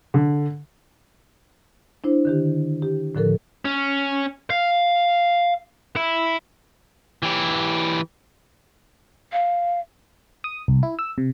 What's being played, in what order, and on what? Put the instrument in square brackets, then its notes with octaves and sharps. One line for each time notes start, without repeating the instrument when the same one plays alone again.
[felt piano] D3
[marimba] D4 E4 C5
D3 D#3 G4
G4
A2 D3 F3 A4 A#4
[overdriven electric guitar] C#4
F5
E4
[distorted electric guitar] E3 G4
[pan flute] F5
[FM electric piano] D#6
C2
E4
E6
C3